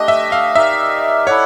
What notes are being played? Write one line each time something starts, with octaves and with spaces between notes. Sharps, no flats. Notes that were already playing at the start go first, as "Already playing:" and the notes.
Already playing: A3 D4 G4 D#5
E5
F5
D#4 G4 A#4 D5 E5
E4 A4 C#5 D5 F#5